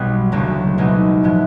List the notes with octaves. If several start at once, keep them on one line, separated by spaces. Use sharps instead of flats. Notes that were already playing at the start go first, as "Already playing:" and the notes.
Already playing: B1 B2 G3 B3
E1 D2 C#3 F#3 A#3
C2 B2 G#3 B3 D#4
A2 F3 G#3 B3